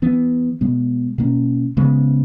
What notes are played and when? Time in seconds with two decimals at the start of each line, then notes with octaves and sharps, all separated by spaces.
0.02 E3 B3
0.61 B2 G#3 B3
1.18 B2 A#3 C#4
1.77 C#3 G#3 B3